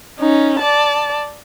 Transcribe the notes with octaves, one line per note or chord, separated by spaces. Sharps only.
C#4 D#4
D5 A5